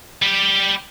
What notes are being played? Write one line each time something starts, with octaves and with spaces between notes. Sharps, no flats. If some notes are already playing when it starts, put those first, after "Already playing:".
G3 G4